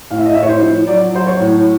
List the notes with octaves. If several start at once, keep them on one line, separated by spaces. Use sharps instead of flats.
A2 F5
E5
D#5
A2 E5
C#5
C5
F3
F#3 D5
F#3 C5
C#5
A2